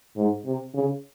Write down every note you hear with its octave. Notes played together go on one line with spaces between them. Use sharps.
G#2
C3
C#3